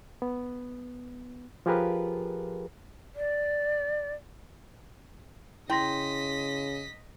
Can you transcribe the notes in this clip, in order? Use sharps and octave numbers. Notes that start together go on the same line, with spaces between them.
B3
F3 F4 G4 G#4 A#4 B4
D5
C#3 E4 D#5 G5 C6 A#6 B6